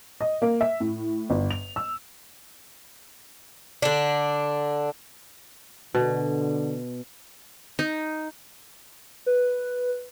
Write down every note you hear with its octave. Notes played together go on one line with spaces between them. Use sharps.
D#5
A#3
E5
A2
G1
F7
E6
D3 D4
B2 D3
D#4
B4